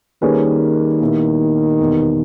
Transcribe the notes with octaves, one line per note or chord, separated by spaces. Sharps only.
D#3 G3 A#3 C#4 G#4 B4
A#2 G3 B3 E4
E2 B2 G3 B3